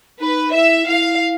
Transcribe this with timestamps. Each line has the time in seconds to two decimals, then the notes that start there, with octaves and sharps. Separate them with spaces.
0.20 D#4 B4
0.54 E4 E5
0.87 E4 F5